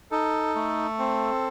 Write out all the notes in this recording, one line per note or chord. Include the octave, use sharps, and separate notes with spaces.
D#4 A4
A3
C4